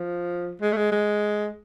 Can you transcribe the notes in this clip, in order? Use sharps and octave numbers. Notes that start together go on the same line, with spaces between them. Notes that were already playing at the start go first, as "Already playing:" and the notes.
Already playing: F3
G#3
A3
G#3
G#3